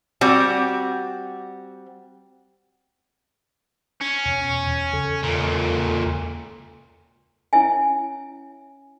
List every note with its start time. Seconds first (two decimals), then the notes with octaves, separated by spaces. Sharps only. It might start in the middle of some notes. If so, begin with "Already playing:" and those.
0.21 G3 C4 F#4
4.01 C#4
4.26 E2 B2
4.93 E2 C#3 A4
5.23 C#2 A#2
7.53 C#4 E4 C#5 E5 G#5